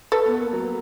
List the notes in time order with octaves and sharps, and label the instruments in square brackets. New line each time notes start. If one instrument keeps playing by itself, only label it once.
[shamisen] A4 B4
[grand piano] B3
A#3
F#3